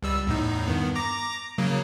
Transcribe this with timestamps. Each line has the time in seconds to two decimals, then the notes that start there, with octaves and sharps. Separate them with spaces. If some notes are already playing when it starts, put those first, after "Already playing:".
0.03 C#2 G3 E6
0.27 E2 A2 D#4
0.68 G2 D#3 B3
0.95 A#5 D6 A#6
1.58 C#3 F#3 A#3